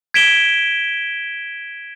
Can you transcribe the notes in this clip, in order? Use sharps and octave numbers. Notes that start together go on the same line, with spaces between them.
G#6 B6 D7 E7 G7